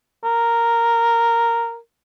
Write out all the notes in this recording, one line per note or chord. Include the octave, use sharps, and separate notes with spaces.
A#4